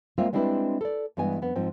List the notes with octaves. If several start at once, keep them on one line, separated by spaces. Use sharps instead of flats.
G#3 A#3 C4 F4 A#4 E5
G3 G#3 C4 D4 E4 B4
A4 D5
G2 E3 G#3 B3 D#5 G#5
F2 B3
G#2 F3 C4